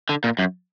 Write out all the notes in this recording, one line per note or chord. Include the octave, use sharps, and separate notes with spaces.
D3
A#2
F#2